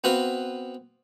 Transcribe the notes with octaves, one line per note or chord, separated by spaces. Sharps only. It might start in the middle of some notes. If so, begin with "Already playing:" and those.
B3 C4 F#4 B4 F5